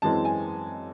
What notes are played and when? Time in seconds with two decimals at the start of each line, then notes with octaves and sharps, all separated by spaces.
0.02 F#2 E3 G#3 C4 A5
0.25 G#5